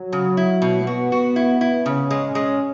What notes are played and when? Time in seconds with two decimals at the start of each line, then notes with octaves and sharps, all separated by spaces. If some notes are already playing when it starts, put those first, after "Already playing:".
Already playing: F#3
0.12 C#3
0.37 E4
0.62 B2
0.87 B3 F#4
1.12 F#4
1.36 E4
1.61 E4
1.85 C#3 C#4
2.10 G#3
2.35 G#3